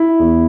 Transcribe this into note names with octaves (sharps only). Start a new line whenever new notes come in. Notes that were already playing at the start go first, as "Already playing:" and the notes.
Already playing: E4
E2